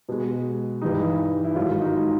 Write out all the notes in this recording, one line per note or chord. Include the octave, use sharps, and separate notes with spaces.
B2 G#3
G2 E3 G3 D#4
E4
G#2 D#3 F#3 F4
D#4